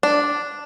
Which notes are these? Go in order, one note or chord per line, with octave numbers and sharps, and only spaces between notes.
D4